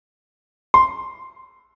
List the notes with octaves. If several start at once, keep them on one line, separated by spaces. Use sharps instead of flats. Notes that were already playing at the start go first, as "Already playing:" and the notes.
C6